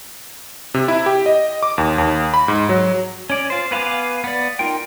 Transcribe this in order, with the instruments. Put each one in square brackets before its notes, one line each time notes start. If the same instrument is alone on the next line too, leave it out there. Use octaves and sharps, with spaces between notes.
[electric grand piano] C3
E4
G4
D#5
D6
D#2
D#2
B5
G#2
F#3
[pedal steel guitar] C#4 D5
F4 C5
B3 B4 F5 G#5 D6
B3 D5
D#4 F4 A#4 G5